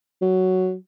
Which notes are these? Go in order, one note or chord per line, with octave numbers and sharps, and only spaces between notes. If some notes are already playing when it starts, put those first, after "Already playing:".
F#3